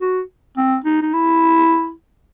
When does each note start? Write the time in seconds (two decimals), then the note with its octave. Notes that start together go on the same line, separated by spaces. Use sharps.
0.01 F#4
0.57 C4
0.84 D#4
1.02 D#4
1.13 E4